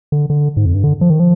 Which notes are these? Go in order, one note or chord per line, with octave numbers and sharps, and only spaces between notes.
D3
D3
G#2
F2
G2
D3
F3
D#3
F3